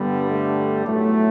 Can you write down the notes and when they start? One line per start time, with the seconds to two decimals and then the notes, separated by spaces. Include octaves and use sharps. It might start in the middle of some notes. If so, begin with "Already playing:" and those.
Already playing: G2 D3 G3 B3
0.31 A3
0.85 B1 A2 F#3 A3